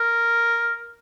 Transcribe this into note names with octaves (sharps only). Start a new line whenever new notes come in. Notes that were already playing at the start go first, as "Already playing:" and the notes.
Already playing: A#4